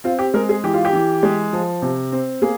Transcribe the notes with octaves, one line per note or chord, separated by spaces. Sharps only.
C4 F4
G4
G#3 A#4
G#4
E3 G4
F4
G4
E3
G#3
F3
C3
C4
A#3 G#4